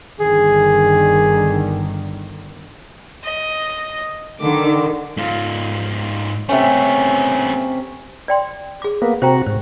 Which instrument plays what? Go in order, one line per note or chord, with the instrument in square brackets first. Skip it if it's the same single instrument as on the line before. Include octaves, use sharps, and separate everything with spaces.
[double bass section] G1 D3 D#3 [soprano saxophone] G#4
[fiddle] D#5
[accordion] D3 [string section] D#3 [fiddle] D6
[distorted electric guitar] G#2 F4
[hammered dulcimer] C3 C#4 [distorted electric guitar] A3 B3
[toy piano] D5 G5 C6
G#4 D6
[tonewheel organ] A#3 B3
[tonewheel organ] C3 F#4 [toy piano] C5 G5 A#5
[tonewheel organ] G#2 [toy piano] C5